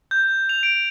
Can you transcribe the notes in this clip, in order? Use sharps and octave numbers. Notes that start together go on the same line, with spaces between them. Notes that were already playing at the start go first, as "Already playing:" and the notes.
G6
F7
D7